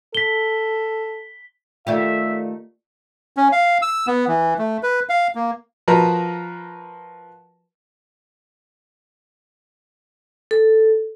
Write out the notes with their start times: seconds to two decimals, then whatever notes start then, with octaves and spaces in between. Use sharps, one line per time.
0.15 A4 B6 G7
1.87 D#3 A3 F4 G4 D5 E5 F5
3.36 C#4
3.52 F5
3.82 E6
4.07 B3
4.28 E3
4.58 A3
4.83 B4
5.09 F5
5.35 A#3
5.88 F3 F#4 A#4 B4
10.51 A4